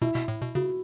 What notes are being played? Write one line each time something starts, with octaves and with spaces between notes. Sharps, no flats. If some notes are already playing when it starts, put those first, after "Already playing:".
B2 E4
B2
A2
B2
C#3 F#4